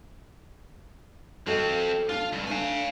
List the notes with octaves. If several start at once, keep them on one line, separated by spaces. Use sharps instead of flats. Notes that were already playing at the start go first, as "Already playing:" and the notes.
F3 C4 F#4 A4 D#5
D4 F4 A5
C#2 G2
A3 D4 F5 G#5